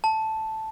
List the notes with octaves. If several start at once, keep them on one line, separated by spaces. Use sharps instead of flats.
A5